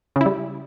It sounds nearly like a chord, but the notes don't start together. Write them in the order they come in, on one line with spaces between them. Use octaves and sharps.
C#3 E4 G3